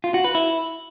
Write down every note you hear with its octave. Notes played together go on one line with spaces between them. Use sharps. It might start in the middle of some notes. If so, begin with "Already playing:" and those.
F4
F#4
B4
E4